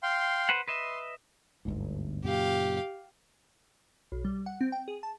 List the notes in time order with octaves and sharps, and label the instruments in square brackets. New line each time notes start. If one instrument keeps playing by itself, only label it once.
[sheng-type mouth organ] F5 G5 C6
[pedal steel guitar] B4 C5 F#5
[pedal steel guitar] B4 D#5 E5 [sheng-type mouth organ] C6
[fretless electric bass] G1 D2 G#2
[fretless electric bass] F#2 A#2 C#3 [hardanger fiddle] G4 F5
[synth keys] B1
G3
F#5
C4
G5
G#4
A5